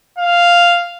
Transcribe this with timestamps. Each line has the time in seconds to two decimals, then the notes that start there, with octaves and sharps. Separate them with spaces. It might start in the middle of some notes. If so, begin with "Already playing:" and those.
0.19 F5